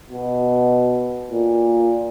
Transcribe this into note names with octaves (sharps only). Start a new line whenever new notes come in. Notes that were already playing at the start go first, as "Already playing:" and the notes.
B2
A#2